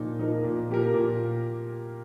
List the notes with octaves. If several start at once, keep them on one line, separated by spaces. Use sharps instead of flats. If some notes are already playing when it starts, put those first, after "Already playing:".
Already playing: A#2 F3 D#4
F3 D#4 A#4
A#2
F3 A#3 G4 A#4
A#2